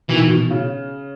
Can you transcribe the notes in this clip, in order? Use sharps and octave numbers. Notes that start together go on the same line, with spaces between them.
B2 D#3 E3
B2
C#3